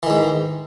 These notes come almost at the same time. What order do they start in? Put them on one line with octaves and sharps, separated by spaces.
E3 D#3 G#2